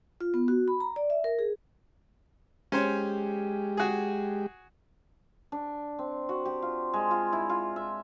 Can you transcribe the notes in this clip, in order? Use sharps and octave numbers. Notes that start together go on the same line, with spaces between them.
F4
B3
F#4
B5
A#5
D5
E5
A#4
G#4
G#3 C#4 G4 C5 C#5
F#4 G#4
D4
C4
F#4
G4
F4
G#3
F4
E4
F4
E5